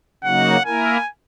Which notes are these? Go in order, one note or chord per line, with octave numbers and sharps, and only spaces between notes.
C#3 F#3 A#3 D#4 F#4 F#5
A#3 E4 A#4 G#5